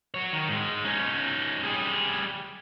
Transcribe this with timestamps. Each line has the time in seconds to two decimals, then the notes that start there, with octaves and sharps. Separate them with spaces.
0.14 F#4 C#5
0.33 D#3
0.49 G#2 G#3
0.84 C#4 D#4
1.63 G3 G#4